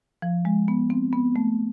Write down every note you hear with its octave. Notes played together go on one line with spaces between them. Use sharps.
F3
G#3
B3
C4
B3
A3